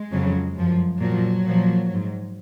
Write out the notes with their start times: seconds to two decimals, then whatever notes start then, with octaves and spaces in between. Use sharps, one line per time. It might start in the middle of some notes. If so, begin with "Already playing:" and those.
Already playing: G#3
0.12 F2 C#3 F#3
0.56 F#2 F3
1.00 A#2 F3 F#3
1.44 A#2 F3
1.88 G#2 F#3